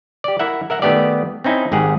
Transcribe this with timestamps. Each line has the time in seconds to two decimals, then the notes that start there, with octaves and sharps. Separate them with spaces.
0.24 G4 D5
0.39 E4 A#4 E5 F#5
0.70 A#4 E5 F#5 A#5
0.82 D#3 A3 B3 G4 D5
1.44 C4 C#4 D#4 E4
1.72 G#1 G#2 G4 G#4 F#5